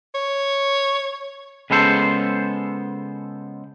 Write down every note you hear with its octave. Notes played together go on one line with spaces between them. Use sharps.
C#5
C#3 G#3 B3 A4 C5